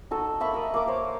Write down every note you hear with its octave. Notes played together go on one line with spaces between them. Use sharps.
D#4 F#4 A4
A#3 E5 B5 C#6
A#4 D#5
A#3 C#6 D6
C5 C#5